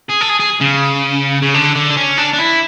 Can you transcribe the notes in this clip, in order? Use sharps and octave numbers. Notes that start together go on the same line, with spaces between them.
G#4
A4
G#4
G#4
C#3
C#3
D3
D3
D4
C#4
D4
D4
E4